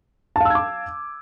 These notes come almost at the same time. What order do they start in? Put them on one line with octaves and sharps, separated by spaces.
A5 F5 E6 G#6 D6